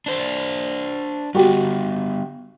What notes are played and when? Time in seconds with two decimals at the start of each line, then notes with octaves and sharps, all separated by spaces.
0.06 D4 C5 D5
1.35 G3 B3 F#4 G4